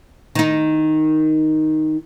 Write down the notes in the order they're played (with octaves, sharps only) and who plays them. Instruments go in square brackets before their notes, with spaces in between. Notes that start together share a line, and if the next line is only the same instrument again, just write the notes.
[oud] D#3 D#4